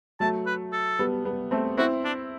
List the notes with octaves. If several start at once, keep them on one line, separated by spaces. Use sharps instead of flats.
F#3 A3 A5
B4
A4
G3 B3
G3 B3
A3 C4
C4 E4 F#4
D4